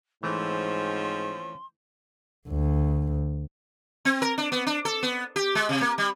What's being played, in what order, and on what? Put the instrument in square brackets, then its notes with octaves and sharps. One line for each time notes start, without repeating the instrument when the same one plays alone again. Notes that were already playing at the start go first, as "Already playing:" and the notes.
[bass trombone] G#2 [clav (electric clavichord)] E3 A3 [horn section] F3 C4 C#4 [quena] C6
[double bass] D2
[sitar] C4
A#4
D4
B3
D4
A4
B3
G4
G#3
C3
A#3
G3